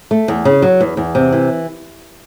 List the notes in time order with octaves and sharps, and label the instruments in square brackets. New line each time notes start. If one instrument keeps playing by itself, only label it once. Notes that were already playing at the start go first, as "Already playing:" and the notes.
[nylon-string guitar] A3
E2
C#3
F#3
E2
E2
C3
E3